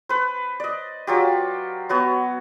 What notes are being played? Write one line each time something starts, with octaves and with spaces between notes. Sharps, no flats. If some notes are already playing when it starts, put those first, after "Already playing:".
B4 C5
D5 D#5
F#3 F4 G4
B3 F#4 C#5